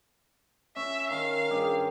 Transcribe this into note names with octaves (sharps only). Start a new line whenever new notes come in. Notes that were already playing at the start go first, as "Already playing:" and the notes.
C#4 E5
D#3 F5
G2 G4 G#4